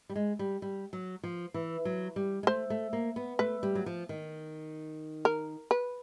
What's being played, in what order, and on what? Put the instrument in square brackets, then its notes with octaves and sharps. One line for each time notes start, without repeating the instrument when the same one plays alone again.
[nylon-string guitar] G3
G#3
G3
G3
F#3
F3
E3
F#3
G3
G#3
[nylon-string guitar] A3 [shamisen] C5
[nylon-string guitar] A3
A#3
B3
[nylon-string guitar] A3 [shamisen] B4
[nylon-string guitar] G3
F#3
F3
D#3
[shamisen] A#4
B4